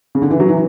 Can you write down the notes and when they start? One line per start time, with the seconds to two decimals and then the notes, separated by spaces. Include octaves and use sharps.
0.15 C#3
0.22 D3
0.30 E3
0.40 F#3
0.48 E3